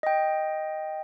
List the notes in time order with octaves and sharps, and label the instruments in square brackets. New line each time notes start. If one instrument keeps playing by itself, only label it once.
[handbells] D#5 G5